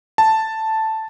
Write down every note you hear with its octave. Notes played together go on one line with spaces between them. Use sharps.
A5